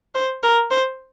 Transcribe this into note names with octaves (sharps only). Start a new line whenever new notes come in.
C5
A#4
C5